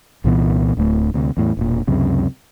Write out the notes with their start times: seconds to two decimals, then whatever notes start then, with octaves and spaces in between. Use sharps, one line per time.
0.24 C2 A#2 E3 B3
0.77 D1 D2 A3
1.14 D2 C3
1.37 E2 A2
1.57 E1 A#2
1.87 C#2 F#2 C3